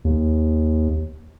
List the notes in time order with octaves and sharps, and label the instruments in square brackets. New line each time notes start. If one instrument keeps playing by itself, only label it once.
[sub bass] D#2